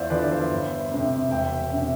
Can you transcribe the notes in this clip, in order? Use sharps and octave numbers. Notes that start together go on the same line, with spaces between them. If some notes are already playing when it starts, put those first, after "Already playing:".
Already playing: E2 C5 D5 E5 F5
D3 F3 B4 D5
D5
C5 E5
G1
F2 C3
E1 E5 G5
C3